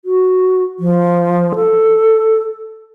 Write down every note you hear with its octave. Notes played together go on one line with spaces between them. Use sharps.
F#4
F3
A4